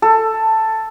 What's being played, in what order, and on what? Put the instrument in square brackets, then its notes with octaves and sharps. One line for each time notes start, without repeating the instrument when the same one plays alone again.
[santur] A4